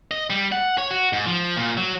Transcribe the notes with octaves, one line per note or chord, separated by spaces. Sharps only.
D#5
G3
F#5
C#5
F#4
G#2
F3
A#2
F#3